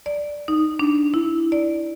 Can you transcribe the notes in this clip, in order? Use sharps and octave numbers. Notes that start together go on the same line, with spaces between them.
D5
D#4
D4
E4
D5